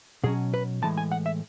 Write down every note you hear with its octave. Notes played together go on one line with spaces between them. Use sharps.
B2 F#3 C#4 G#4
B4
A2 E3 G#3 A5
G#5
F#5
E5